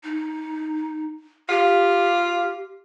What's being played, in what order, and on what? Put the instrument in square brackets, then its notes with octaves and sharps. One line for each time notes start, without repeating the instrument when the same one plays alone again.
[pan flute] D#4
[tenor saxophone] F4 [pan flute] G4